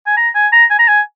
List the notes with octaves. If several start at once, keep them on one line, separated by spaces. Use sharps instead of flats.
G#5
A#5
G#5
A#5
G#5
A#5
G#5